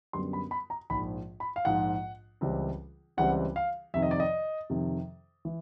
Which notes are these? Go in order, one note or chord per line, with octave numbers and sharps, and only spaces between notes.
F#2 D3 G3 B3 C6
B5
B5
A#5
A#1 G#2 F3 B5
B5
F5
A#1 G#2 F3 F#5
C#2 C#3 E3 G3 C4
C#2 C#3 E3 G3 C4 F#5
F5
F2 C3 D#3 E5
D#5
D5
D#5
F2 C3 D#3
E3